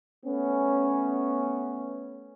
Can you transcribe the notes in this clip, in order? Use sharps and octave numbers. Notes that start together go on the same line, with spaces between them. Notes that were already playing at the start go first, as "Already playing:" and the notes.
A3 B3 C#4